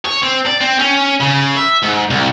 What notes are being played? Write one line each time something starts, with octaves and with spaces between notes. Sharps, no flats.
C#5
C4
D5
C4
C#4
C#3
E5
G#2
C2